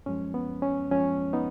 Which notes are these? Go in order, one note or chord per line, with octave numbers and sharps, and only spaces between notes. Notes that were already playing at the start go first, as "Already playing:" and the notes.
F#2 F3 G#3 C#4
B3
C#4
F#2 F3 G#3 C#4
B3 D#4